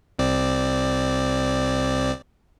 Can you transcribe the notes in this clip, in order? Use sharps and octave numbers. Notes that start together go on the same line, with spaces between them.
C2 C4 D5